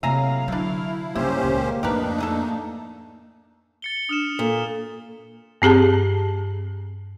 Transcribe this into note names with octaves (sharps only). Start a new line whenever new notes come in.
A2 C3 F#3 A#3 E5 F5 G#5 A#5
D3 F#3 A3 D4 E4
G2 C#3 A#3 C#4 E4 G4 C5
C#2 A#2
F2 A2 D4 D#4 G4 A#4 B4
A3 G#4 A4
A6 C#7 G7
D4 D#6 F6 E7
A#2 A4
G2 C4 G4 G#4 A5